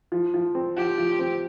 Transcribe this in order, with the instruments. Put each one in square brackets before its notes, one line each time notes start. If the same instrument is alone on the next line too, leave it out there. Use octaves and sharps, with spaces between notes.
[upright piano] F3
F3
C4
[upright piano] F3 [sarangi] G4
[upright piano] F3
C4